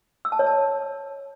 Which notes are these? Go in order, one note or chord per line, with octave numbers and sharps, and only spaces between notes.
E6
A5
C#5
A5